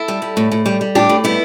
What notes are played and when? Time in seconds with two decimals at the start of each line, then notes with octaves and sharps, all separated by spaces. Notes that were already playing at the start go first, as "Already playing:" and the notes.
Already playing: E4 A4
0.08 G3
0.22 G3
0.37 A2
0.52 A2
0.66 G3
0.81 G3
0.95 A2 D4 G4
1.09 A2
1.24 G3 B3 E4